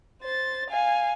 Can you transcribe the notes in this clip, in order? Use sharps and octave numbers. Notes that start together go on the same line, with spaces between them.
C5 A6
F5 G#5